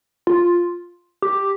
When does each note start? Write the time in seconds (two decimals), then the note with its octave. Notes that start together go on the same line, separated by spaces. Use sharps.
0.27 F4
1.22 G4